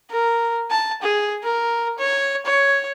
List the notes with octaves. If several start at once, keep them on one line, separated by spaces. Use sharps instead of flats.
A#4
A5
G#4
A#4
C#5
C#5